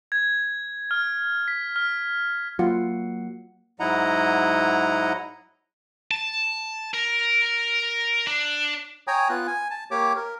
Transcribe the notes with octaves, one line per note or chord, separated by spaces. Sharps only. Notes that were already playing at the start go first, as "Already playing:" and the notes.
G#6
F6
B6
F6
F#3 A#3 F4 F#5 C#7
G#2 F#3 E4 D#5 F#5 A#5
A5
A#4
D4
C#5 G5 G#5 A#5 D#6
B3 F4 F#6
G#5
A5
A#3 G4 C#5 D6
A#4